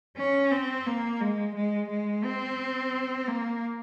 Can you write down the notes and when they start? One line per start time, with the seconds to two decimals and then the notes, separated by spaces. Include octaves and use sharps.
0.17 C#4
0.51 C4
0.86 A#3
1.20 G#3
1.55 G#3
1.89 G#3
2.24 C4
3.28 A#3